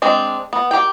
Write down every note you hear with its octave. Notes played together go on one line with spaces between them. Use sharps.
G#3 C4 D4
B3
G4 A#4 G5